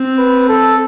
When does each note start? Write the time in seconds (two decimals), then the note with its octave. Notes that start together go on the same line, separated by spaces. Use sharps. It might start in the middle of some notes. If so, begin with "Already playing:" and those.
Already playing: C4
0.18 B4
0.49 A4